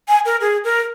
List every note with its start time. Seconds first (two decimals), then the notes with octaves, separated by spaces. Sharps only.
0.09 G#5
0.25 A#4
0.41 G#4
0.64 A#4